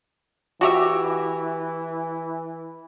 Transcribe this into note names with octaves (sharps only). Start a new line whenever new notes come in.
E3 F#4 G4 E5